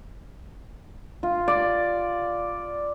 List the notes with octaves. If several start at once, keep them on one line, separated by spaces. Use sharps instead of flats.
F4
D5